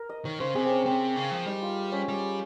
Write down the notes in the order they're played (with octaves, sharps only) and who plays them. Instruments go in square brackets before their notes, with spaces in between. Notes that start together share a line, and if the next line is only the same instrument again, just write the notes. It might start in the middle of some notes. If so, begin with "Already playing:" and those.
Already playing: [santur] A#4
D#5
[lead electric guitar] D#3 [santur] C#5
[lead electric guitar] C#3 [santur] C5
[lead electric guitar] C3 [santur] G#4
[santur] C4 C#4
[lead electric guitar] C3 [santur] C4
[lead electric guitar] C#3
F3
[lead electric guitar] G3 [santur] D#4
[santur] F4
C#4
[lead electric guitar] G3